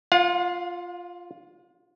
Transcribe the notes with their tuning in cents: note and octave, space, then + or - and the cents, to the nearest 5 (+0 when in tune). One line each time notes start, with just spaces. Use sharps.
F4 +0 F5 +45